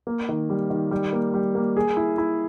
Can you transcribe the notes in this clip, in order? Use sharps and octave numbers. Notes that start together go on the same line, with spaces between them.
A#3
D#3
G3
D#3
G3
A#3
G3
A#3
G#4
E4
E4